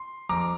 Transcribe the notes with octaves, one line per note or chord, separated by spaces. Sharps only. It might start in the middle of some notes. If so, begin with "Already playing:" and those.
Already playing: C6
F2 A#5 D6